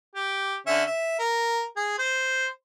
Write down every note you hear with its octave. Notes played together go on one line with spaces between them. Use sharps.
G4
D3 C#4 E5
E5
A#4
G#4
C5